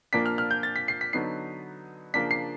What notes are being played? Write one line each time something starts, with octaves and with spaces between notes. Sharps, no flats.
A#2 F3 A#3 D4 B6
F6
F6
G6
A6
B6
C7
B6
D3 F#3 B3 D#4 C7
C#3 F3 A#3 D4 B6
C7